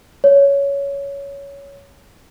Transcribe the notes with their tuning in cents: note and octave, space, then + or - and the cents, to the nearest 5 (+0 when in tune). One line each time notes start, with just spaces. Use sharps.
C#5 +15